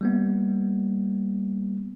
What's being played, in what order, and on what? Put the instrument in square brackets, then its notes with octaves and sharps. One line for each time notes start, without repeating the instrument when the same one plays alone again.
[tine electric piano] G3 A#3 B3